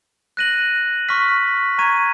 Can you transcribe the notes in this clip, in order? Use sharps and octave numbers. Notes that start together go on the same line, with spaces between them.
F#6 A#6 D#7 F#7
C#6 F6 B6
A#5 C#6 G#6 D#7